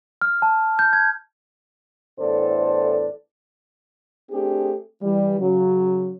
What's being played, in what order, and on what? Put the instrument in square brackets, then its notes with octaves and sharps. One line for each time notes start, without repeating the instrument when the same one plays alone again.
[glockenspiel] F6
A5
G6
G#6
[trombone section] E2 A2 D4 A4 C5
[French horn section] A3 C4 D4 G4 G#4
E3 G3
C#3 F#3